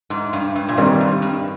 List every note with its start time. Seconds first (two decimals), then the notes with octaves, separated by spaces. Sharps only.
0.10 G#2
0.33 G2
0.56 G2
0.69 A#2
0.77 G#2 D#3 G3 C4
1.00 G2
1.22 G2